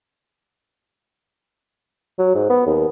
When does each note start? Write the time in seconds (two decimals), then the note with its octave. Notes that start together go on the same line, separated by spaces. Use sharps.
2.19 F#3
2.35 G#2
2.50 B3
2.67 D#2